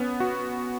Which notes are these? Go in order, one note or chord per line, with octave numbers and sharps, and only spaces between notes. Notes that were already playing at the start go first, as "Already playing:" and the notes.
Already playing: B3 C#4
F#4